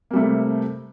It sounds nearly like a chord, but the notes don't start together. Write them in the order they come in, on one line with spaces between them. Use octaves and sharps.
A#3 G3 A3 C3